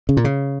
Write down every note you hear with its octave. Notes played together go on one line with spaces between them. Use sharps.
C#3
A#2
C#3